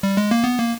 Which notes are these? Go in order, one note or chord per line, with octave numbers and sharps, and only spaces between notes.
G3
G#3
A#3
B3
A#3